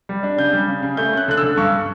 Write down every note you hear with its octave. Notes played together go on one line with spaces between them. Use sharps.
G3
D4
C#3 G6
G3
C#3
C#3
A3 G6
C#4 F#6
D3 F#6
E6
D3
G2 C#6